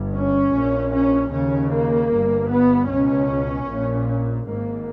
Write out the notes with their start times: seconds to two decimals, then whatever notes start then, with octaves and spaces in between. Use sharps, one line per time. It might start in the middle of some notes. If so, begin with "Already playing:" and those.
Already playing: G1 G2
0.15 C#4
0.53 A#1 A#2
0.93 C#4
1.32 D#2 C#3 C#4
1.71 A#3
2.11 G1 G2
2.49 B3
2.88 C#2 B2 C#4
3.67 A#1 A#2
4.46 G#1 G#2 A#3